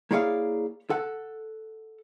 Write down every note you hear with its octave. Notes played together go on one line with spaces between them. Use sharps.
A#3 E4 G#4 C#5 D5 F5
A4 F#5